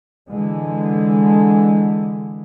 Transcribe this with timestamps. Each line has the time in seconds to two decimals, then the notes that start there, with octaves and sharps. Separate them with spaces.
0.28 D3 E3 G#3